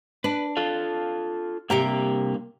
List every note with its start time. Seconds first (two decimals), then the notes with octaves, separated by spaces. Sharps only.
0.24 D4 B4
0.57 F4 A4 F5
1.70 G2 C3 A#3 G4 G5 A#5